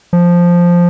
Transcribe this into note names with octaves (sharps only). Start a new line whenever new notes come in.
F3